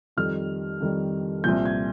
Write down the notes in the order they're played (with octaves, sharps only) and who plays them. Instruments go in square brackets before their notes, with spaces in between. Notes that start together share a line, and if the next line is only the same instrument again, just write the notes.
[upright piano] F2 D#3 G3 F6
F2 D#3 G3
C2 A#2 F3 G6
G#6